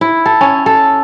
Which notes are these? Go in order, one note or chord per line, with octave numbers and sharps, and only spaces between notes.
E4
A4
C#4
A4